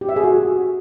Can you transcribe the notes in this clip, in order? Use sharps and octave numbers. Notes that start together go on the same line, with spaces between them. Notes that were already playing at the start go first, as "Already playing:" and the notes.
G4
E5
G#4
F#4